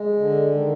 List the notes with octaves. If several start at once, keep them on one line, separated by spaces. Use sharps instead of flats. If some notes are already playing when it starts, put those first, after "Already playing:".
Already playing: G#3
D3
D#3